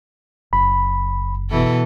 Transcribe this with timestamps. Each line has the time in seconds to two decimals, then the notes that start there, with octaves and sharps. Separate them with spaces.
0.53 F#1 B5
1.50 B2 E3 A4